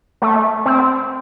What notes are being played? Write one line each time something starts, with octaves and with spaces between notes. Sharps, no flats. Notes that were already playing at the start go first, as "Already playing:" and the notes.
A3
C4